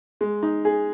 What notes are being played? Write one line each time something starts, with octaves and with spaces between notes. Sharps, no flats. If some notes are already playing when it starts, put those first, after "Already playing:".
G#3
D#4
G#4